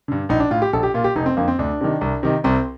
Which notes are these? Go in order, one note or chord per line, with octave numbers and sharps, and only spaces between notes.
G2 D3
A#1 D#4
D4
A2 F4
G4
A#1 A4
G4
A#2 F4
G4
F1 D#4
C4
F2 D3 A#3
C4
D2 D4
C3 D#3
C2
C3 D#3
C2 C4